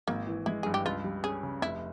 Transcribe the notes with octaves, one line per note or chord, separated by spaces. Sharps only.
G#1 A#3
E3
G#3 E4
G2 G#4
G4
C#2 F4
G3
C#4 G#4
C#3
F1 E4